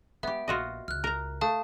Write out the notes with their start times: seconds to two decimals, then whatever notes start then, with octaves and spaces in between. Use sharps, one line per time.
0.23 G#3 B3 G4 E5
0.48 A#1 F4 F#4 D#5
0.88 C#2 F6 F#6
1.04 A#4 A#5
1.41 A3 F5 A5 D#6